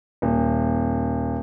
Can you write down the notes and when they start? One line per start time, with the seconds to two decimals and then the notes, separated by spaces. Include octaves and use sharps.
0.22 D#1